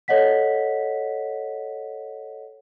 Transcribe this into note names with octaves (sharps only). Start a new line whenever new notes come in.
A4 C#5 D#5 F#5 B6